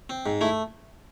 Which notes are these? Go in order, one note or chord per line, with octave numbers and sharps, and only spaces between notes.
C4
G#2
A3 E4